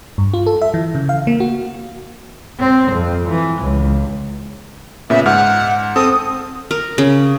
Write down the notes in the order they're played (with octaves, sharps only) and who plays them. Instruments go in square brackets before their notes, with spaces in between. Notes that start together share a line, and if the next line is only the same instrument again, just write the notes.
[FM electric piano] G2
F4
A4
E5
E3
C#3
F5
A#3
F#4
[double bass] C4
F2
E3
C#2
[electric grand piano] A#2 C#3 B3 [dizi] E5
[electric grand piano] G#2 F6 [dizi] F#5
[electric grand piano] C4 A4 [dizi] D#6
[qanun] A#4
C#3